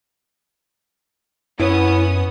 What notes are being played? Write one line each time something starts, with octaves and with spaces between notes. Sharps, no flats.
F#2 B3 C#4 E4 B4 C#5 D#6